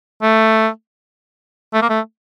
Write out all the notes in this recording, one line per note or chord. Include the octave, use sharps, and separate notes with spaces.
A3
A3
A#3
A3